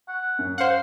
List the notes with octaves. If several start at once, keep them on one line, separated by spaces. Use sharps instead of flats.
F#5
F#2
C5 F5 F#5